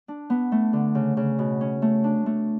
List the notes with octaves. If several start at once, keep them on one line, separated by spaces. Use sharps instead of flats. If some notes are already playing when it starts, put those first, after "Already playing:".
D4
B3
A3
D3
C#3
C#3
B2
C#4
A3
D4
A3